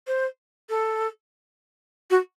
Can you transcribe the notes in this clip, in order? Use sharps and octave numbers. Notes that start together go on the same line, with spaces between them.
C5
A4
F#4